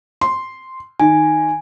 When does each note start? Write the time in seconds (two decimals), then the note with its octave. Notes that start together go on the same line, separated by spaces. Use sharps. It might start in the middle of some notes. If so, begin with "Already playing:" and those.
0.21 C6
1.00 D#3 G#5